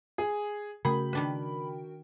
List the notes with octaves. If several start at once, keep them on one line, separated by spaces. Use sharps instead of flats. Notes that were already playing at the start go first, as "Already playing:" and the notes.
G#4
C#3 A3 C#4 F#4 G#4 A#4 G5 B5
D#3 D4 B4